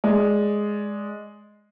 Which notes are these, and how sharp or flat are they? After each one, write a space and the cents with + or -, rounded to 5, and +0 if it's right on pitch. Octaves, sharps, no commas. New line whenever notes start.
G#3 +0 D5 +0